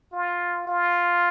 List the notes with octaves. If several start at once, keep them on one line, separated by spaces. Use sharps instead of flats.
F4
F4